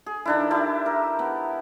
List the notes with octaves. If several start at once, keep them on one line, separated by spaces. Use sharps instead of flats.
G#4
D#3 D4 E4
E4 G4 E5 A5
A#4
B3